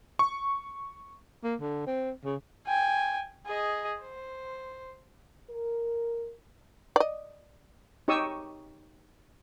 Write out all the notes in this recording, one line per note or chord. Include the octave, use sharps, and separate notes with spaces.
C#6
A#3
D3
C4
C#3
G5 G#5
G#4 D#5
C5
A#4
D5 D#5
D#4 G4 C#5 C#6 D#6 E6